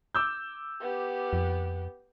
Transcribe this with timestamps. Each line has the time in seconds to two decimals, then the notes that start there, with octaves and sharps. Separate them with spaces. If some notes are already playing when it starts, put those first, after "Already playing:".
0.15 D6 E6 G6
0.81 B3 G4
1.33 F2